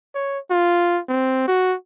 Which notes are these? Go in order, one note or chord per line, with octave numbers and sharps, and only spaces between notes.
C#5
F4
C4
F#4